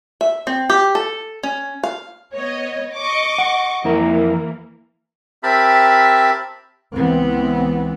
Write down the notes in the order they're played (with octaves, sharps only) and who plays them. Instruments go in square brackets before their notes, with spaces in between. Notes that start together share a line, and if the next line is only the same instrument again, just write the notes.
[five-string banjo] E5
C4
G4
A4
C#4
F5
[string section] B3 C#5 D#5
D#5 C#6 D6
[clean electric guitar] F#5
[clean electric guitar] F2 E4 A#4 [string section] E3 A#3
[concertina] C4 G4 A#4 E5 A5 B5
[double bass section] C#2 E3 B3 C4